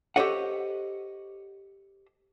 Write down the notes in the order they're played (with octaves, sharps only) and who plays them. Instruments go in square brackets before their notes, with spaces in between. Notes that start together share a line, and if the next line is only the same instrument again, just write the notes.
[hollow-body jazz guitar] G4 A4 C5 C#5 D#5 F#5